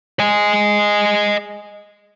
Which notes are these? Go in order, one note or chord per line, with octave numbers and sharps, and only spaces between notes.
D#5 G#5